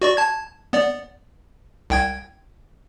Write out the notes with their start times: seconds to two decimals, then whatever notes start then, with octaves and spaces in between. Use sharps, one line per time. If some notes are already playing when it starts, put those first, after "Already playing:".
0.02 F#4 D5 C#6
0.17 A5 G#6
0.73 B3 D5
1.90 C2 G5 G#6